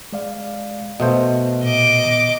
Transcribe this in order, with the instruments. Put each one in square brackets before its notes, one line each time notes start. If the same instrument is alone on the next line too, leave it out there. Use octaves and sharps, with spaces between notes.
[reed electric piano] G#3 D5 F5
[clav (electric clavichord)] B2 A3 C5 [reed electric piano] D#5
[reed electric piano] A#2 B3 [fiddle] D#5 D6